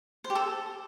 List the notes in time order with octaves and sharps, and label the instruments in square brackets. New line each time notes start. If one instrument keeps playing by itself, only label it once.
[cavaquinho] C5
G4
A4